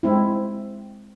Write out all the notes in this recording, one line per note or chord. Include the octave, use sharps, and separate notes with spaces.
G#3 C4 E4